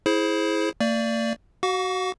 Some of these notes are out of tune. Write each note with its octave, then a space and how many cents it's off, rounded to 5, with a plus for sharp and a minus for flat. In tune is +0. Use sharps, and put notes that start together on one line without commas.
E4 -10 G#4 +25 C5 +10
A#3 -45 D5 +0
F#4 +15 F#5 -45 C#6 +45